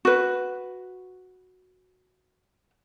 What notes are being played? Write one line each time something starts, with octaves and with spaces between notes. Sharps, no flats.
F#4 B4